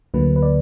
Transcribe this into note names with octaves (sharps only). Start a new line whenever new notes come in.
D2 D3 F#3 A#3 B4
B4
D5